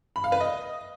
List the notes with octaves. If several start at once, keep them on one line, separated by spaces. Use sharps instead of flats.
B5
F5
B4
D#5